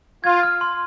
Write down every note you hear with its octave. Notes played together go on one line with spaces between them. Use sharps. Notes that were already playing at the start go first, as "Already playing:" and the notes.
F4 G#6
F6
C6